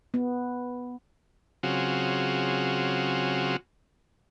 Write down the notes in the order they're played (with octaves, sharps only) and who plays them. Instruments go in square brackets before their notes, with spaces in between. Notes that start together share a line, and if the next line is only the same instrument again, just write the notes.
[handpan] B3
[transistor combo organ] C#3 F#3 C4 F4 F#4 G#4